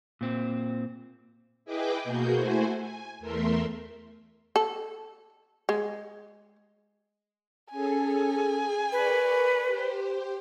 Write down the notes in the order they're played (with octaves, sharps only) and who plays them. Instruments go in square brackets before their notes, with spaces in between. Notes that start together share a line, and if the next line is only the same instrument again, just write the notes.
[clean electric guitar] A#2 C4
[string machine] E4 G#4 B4 D#5 G5 D6
B2 A#3 F#4 G#4 G6
A3 E4 F#4 C5 G#5
G#5
E2 A3 A#4 E5 C6
[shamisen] A4
G#3
[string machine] C#4 G#4 A4 [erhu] G#5
[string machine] G#4
[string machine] A#4 D5 C#6 [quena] B4
[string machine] G4 C5